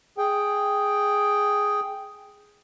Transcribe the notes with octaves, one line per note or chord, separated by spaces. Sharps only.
G#4 G5